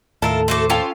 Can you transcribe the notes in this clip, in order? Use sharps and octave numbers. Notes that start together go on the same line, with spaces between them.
D#2 A2 F4 A4 A#4 E5 A5
A3 F#4 A4 C5 D6
C#4 F4 A4 F5 G5 A5